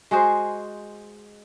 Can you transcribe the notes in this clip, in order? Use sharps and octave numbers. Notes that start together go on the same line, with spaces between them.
G#3 F#4 G#4 C5